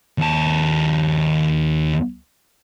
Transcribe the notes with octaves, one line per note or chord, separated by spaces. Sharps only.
D#2 A5